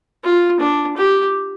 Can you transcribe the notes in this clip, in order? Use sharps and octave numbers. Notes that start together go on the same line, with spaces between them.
F4
D4
G4